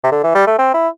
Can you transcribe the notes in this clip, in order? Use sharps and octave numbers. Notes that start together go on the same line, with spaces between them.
C3
D3
E3
G3
A3
C4
E4